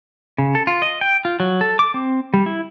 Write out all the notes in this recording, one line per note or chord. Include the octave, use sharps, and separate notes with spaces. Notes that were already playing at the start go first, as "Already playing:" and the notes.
C#3
A4
F4
D#5
G5
F4
F#3
A4
D6
C4
G3
E4